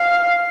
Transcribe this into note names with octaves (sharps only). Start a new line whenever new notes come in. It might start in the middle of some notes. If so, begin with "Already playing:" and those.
Already playing: F5